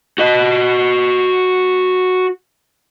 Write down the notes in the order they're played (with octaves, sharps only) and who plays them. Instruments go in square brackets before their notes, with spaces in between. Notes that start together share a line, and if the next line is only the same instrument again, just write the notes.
[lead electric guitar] F#4 D#5